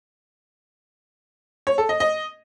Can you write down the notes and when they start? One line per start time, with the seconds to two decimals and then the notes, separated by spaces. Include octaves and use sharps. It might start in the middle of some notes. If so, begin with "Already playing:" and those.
1.67 C#5
1.78 A4
1.89 D#5
2.00 D#5